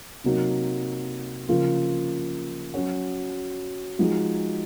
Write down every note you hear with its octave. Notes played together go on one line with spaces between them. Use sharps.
C3 F#3 A#3 D#4
C#3 F3 A#3 F4
F#3 C#4 F#4
F3 G#3 D#4 F#4